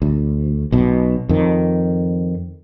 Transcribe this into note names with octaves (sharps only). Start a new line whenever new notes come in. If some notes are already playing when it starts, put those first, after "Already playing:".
D2
B1 B2
F2 D#3